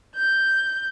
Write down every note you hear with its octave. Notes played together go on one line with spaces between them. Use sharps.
G6